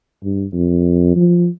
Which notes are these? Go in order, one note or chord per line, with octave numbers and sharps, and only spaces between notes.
G2
F2
F3